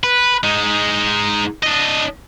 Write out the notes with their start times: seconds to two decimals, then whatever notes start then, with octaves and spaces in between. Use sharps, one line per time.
0.04 B4
0.43 G#3 D#4
1.63 D4 D#5